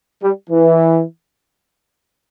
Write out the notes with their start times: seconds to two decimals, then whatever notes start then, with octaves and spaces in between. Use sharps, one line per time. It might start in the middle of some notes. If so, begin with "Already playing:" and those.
0.22 G3
0.50 E3